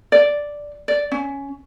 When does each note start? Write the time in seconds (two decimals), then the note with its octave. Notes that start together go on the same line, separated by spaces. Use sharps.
0.12 D5
0.88 D5
1.11 C#4